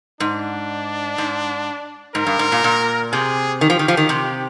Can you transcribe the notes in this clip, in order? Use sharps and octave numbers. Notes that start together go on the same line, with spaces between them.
G#2 D4
G#2
G#2 A#4
G2
G#2
A#2
A#2
C3 G#4
D#3 G4
F3
D#3
F3
D#3
C3